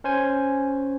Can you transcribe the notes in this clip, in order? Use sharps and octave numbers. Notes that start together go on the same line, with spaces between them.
C#4 C5 G#5